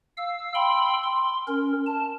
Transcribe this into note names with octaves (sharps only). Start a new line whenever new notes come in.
F5 E6
G5 B5 C6 E6
C6
C#4 A#4
A5